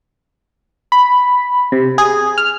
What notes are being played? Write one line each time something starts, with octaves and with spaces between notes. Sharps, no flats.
B5
C3
G#4
F6